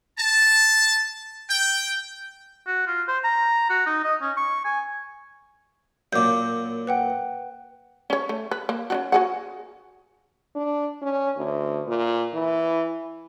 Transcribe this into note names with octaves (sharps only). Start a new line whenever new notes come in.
A5
G5
F#4
F4
C5
A#5
F#4
D#4
D#5
C#4
C#6
G#5
F#2 A#2 D6 G6
B4 F#5 G5
C#4 C#5
A3
B4
A#3
C#4 D4 F#4
F#4 G#4 F#5
D4
C#4
D2
A#2
E3